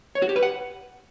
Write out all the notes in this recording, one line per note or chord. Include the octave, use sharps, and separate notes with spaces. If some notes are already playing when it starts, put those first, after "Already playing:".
C#5
F#4
G4
B4
F#5